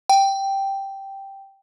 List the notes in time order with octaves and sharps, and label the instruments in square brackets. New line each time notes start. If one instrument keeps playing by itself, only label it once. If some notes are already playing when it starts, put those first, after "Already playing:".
[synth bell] G5